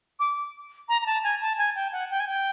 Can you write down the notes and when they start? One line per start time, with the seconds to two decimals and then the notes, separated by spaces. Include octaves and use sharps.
0.20 D6
0.89 A#5
1.02 A#5
1.06 A5
1.24 G#5
1.41 A5
1.58 G#5
1.75 G5
1.92 F#5
2.10 G5
2.20 G#5
2.27 G5